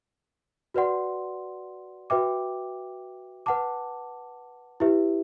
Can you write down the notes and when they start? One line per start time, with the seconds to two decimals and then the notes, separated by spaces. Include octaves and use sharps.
0.74 F#4 B4 D5 F#5 C6
2.10 F#4 B4 E5 G5 D6
3.46 B4 F#5 A5 D6
4.80 E4 G4 B4 E5